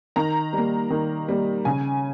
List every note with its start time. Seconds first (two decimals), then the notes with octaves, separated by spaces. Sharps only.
0.16 D#3 A#5
0.53 G3
0.58 A#3
0.90 D#3
1.28 G3 A#3
1.65 C#3 G#5